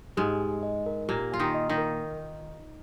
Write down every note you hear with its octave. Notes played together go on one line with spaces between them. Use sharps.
G#2 G#3 G4
G#5
D#5
A#4
A#2 A#3 G4
F4 G#5
D#3 D#4
D#5
D#3 D#4
A#4